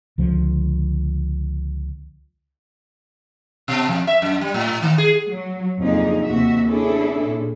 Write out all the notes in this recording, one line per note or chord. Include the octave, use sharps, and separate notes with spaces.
C#2 D3 F3
B2
F2
E5
F#2
G3
A2
D#3
G#4
F#3
F2 C#3 A#3 D4 D#4 G#4
D#2 C3 F#4 E5
B3 C#4 D4 E4 G#4 A4
A#2